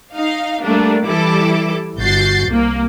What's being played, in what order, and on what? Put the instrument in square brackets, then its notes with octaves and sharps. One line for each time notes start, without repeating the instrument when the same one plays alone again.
[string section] D#4 F5
G3 A3 A#3 D4
E3 G3 E4 A4 D6
G1 F#4 G6 A6 C7
C2 A#3